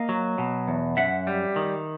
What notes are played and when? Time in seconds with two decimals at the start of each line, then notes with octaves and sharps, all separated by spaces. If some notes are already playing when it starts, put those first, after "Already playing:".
Already playing: A#3 D#5 F5
0.09 F#3
0.38 B2
0.68 E2
0.97 F#2 E5 F#5
1.27 G3
1.56 D#3